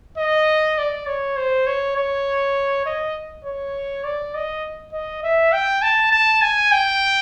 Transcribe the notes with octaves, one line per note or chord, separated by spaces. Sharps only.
D#5
D5
C#5
C5
C#5
C#5
D#5
C#5
D5
D#5
D#5
E5
G5
A5
A5
G#5
G5